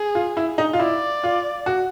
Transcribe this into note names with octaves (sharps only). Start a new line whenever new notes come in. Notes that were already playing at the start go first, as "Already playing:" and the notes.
Already playing: G#4
F4
E4
D#4
F4
E4 D5
F4
F#4